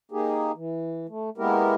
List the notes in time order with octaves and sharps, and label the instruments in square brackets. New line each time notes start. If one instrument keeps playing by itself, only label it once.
[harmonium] A#3 D#4 G4 G#4
E3
A3
G#3 A#3 B3 E4 G4 A#4